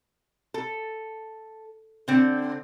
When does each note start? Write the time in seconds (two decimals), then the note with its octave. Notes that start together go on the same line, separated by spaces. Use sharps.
0.54 A4
2.08 D3 C4